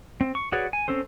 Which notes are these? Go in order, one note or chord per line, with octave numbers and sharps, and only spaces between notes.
C4
C#6
F#4 G#4 B4 C#5 D5
G#5
C4 C#4 A4 C5